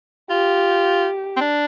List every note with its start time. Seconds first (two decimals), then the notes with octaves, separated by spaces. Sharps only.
0.30 F4 G4
1.37 C4
1.41 D4